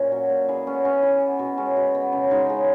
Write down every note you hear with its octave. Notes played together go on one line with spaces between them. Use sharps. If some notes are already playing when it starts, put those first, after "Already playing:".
Already playing: A#2 C#4
F#3
A#2
E3 G#4
B3 C#4
B3 C#4
E3
B3
B2
G#3 C#4
B2
B3
C#3
G#3 D#4
C#3